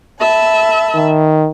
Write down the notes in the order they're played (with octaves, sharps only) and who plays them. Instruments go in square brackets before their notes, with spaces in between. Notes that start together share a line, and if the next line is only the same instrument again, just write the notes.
[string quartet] E5 A5 B5
[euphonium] D#3